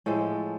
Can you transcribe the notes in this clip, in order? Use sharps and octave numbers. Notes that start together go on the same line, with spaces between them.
A2 F3 G#3 A4